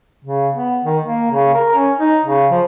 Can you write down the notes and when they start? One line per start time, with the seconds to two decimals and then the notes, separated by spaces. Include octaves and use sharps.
0.24 C#3
0.53 B3
0.84 D#3
1.04 A#3
1.31 C#3
1.54 A#4
1.75 C#4
1.99 D#4
2.25 C#3
2.51 F3